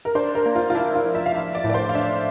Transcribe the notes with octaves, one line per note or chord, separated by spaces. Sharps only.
A#4
D4 C5
A#4
A#3
F4
F4
D4 E4
F4
F3
E5
F5
D4 E5
D5
A2
D5
C5
F5
D4 E5